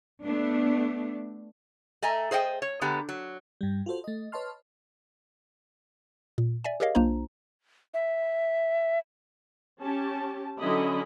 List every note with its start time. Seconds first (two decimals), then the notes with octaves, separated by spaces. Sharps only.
0.23 A3 B3 D4
2.02 A3 D#5 G#5 A#5
2.31 G#4 C5 D#5 F#5 G5
2.62 C#5
2.81 D3 G#3 B3 G4 A#5
3.09 F#3
3.61 G2 G3
3.86 F4 F#4 A4 C5
4.04 A3 D#5
4.32 B4 C#5 D#5 A5 C6 F6
6.38 A#2
6.64 D5 E5 G#5
6.80 G4 G#4 A#4 C#5 D#5 F5
6.95 B1 A#3 D4 F4 C5 A#5
7.94 E5
9.82 C#4 G4 A5
10.60 D3 F#3 C#4 E4 D#5 B5